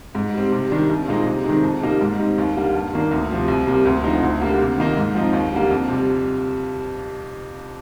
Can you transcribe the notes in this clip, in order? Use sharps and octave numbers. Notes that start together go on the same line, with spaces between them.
G#2
G3 C4
C3
D#3 G3 D4
C2
A#2 G#3 C4 D#4
C3
D#3 G#3 C4 D#4
F2
C3 G3 A#3 D#4
G#2
G3 C4 D#4
D#2
D3 G3 A#3
G2
D#3 A#3 D4
D2
C3 F3 C4
C2
C3 G3 A#3
D2
D3 F3 C4 D#4
D2
D3 G3 A#3
C3
D#3 A#3 D#4
G#2
F3 C4 D#4
D#2
D3 G3 A#3
F2
C3 G3